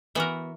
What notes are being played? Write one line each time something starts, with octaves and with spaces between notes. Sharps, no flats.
E3 B3 F#4 A#4